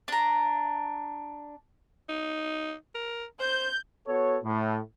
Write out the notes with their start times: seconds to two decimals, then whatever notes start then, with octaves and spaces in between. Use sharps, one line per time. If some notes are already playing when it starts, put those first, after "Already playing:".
0.08 D4 A#5
2.09 D#4
2.95 A#4
3.40 C5 G6
4.08 B3 F#4 A4 C#5
4.44 A2